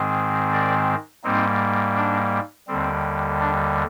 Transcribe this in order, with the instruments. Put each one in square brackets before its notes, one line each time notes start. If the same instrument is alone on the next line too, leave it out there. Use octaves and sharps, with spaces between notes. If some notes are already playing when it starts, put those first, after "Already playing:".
Already playing: [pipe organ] G#2 D#3 G#3 C4
A#4 D5
G#2 G3 A#3 C4 D#4
D4
D#2 D3 G3 C4
D4